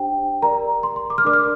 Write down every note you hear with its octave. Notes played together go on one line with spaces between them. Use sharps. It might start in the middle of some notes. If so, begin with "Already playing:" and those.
Already playing: D4 G4 C5 G5
G4 A#4 D5 A#5
C6
C6
D6
F6
D4 A#4 D5 D6
F6